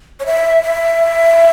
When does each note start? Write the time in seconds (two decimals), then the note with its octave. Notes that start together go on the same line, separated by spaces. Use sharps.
0.20 C#5
0.26 E5
0.63 E5